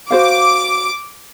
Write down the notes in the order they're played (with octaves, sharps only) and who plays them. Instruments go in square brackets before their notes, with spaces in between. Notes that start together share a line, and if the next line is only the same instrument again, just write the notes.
[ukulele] F#4 C5 F5 [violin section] D6